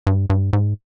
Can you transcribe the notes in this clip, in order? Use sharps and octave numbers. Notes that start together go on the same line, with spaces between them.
G2
G2
G#2